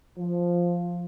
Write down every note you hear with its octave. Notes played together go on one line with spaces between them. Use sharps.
F3